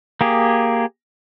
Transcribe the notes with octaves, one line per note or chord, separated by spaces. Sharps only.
A#3 G4 G#4